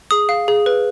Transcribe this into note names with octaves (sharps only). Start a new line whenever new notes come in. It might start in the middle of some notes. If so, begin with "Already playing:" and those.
G#4 D#6
F5
G#4
B4